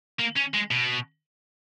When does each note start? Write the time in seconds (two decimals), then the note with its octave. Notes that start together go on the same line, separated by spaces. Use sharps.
0.19 A#3
0.36 C#4
0.54 G#3
0.71 B2